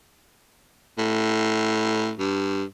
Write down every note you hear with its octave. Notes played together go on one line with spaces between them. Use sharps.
A2
G2